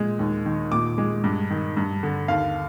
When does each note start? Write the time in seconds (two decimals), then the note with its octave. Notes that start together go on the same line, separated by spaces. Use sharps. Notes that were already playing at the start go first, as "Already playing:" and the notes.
Already playing: A#2 G#3
0.19 D#2
0.46 D#3
0.72 A#2 D6
0.98 G#3
1.24 G2
1.50 D#3
1.77 G2
2.03 D3
2.28 D#2 F5